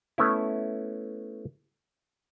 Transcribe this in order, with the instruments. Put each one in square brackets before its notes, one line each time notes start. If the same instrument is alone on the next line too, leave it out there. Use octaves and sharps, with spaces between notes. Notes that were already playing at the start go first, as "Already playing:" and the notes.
[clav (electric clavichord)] A3 B3 C#4 E4